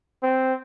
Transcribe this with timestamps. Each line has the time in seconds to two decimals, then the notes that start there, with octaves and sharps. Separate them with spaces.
0.23 C4